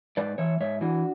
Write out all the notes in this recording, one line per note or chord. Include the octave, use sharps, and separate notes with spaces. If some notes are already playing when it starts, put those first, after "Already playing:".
G#2 B4 D5
E3 C#5 E5
G#2 C#5 E5
E3 D4 F#4